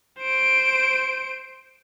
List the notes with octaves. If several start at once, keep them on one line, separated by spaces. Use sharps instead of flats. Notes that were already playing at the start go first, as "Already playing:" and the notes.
C5 D7